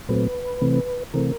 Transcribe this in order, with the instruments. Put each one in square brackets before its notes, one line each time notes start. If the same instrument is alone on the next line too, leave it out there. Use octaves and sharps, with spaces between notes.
[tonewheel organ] A#2 F#3 A3 C4 B4
C3 E3 A3 C4
C3 E3 A3 C4 A#4